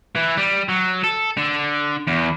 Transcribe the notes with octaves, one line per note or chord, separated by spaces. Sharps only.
E3
G3
F#3
A4
D3
E2